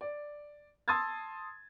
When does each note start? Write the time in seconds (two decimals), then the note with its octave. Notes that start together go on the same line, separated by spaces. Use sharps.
0.01 D5
0.88 A5 C6 D#6 E6 G#6 A6